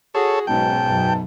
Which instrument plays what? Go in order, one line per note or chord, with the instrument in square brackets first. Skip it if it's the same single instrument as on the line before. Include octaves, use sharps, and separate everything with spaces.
[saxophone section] F#4 G#4 [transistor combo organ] A4 C#5
[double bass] B1 C#4 [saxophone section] G#2 B2 [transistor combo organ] G5 [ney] A5
[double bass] B1 F#2